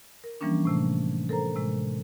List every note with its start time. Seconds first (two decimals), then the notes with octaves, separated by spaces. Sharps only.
0.24 A#4
0.41 E3 F3 G3 A#3 C#4 D4
0.65 A2 C3 A3
1.29 A4 A#4 C5 A#5
1.55 A2 C3 G#3